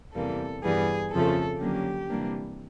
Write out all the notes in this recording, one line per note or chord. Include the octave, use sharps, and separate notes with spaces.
E2 C3 E3 G3 A#3 A4
G2 E3 G3 B3 G#4
F2 C#3 F3 A3 A4
D3 F#3 A#3 C#4 G4
C3 E3 G3 A#3 D4